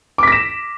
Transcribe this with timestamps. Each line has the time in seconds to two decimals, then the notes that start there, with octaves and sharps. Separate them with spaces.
0.18 D6
0.23 B6
0.27 A#6
0.32 E7